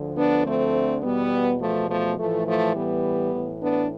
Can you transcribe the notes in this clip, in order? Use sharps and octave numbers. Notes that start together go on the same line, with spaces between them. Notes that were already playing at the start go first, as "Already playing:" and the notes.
Already playing: D2 D3 F3
B3 D4
A3 C4
E2 B2 G3 B3
F3 A3
F3 A3
A2 E3 F3 A3
F3 A3
G3 B3
A2 E3
B3 D4